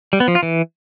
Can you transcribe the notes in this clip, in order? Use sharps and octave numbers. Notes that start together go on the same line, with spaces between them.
G3
B3
F3
F4
E3